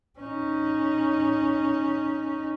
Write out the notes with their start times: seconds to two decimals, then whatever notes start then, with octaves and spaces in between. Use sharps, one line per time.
0.19 C#4 D#4